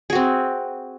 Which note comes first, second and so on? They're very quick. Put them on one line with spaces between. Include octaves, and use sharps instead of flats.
G#4 F#4 C4